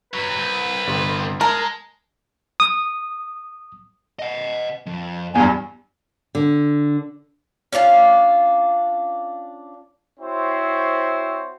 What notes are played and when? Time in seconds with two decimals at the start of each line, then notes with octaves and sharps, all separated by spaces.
0.14 G2 F#3 B4
0.39 C2
0.87 G1 G3 C6
1.41 G#3 A#4 A5
2.60 D#6
4.19 D#5 F#5
4.86 F2
5.35 E2 G2 F4 G#5
6.35 D3
7.73 C#4 D4 F4 F5
10.19 C4 E4 F#4 C5 C#5